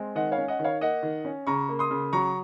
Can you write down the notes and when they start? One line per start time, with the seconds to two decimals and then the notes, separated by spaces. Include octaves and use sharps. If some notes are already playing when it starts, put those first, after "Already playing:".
Already playing: G#3 C4
0.15 D#3 D#5 F#5
0.32 C#5 F5
0.38 C#4
0.48 D#5 F#5
0.59 D#3
0.64 C#5 F5
0.81 A#3 D#5 F#5
1.02 D#3
1.25 C#4
1.47 C#3 A#5 C#6
1.69 A#3
1.79 C6 D#6
1.91 C#3
2.13 F#3 A#5 C#6